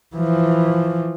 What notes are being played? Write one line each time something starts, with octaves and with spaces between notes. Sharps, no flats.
E3 F3